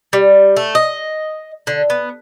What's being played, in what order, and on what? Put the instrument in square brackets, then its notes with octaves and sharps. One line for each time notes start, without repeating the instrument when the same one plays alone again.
[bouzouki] G3
A3
D#5
D3
B3